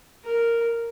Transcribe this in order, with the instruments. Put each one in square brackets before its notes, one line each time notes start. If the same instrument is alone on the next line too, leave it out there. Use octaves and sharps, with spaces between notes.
[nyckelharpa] A#4